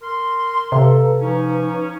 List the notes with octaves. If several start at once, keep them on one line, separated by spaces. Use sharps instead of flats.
A#4 C6
C3 A4 B4 F5 A#5
F3 C#4 D#4